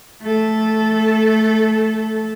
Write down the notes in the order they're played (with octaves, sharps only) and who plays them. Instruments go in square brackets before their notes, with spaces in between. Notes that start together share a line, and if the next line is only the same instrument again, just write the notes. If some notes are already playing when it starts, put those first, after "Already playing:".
[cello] A3 A4